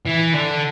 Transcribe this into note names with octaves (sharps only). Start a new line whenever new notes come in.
E3
D3